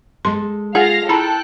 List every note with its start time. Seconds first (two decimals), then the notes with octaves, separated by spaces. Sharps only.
0.25 G#3 A4 C6
0.75 F4 G#4 F5 F#5 A#6
1.09 E4 A4 G5 A#5 B5 F#6